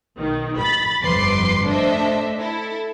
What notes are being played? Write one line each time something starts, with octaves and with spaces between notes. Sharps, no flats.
B1 D#3
B5 A6
G1 F2 B4 C6 D6 C7
A3 D4 A4 C5 D#5 E5
E4 A4